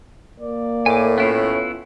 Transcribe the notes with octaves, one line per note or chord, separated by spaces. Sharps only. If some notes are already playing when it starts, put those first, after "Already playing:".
A#3 D5
A2 G#5 D6
B3 C#4 E4 F4